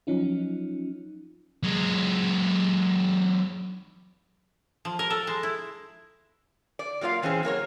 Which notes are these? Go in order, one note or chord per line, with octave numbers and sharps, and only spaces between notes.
F3 F#3 C#4 D#4 F4
F#3 G#3
F3
A#4
A4
G#3
E4
D5
F#3 A#3 F4 D5 F5
A#2 E3 C4 C#4 G#4
F#3 A#3 A#4 C#5